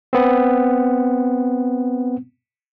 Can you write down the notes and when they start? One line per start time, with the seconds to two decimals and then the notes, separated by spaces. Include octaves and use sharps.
0.13 B3 C4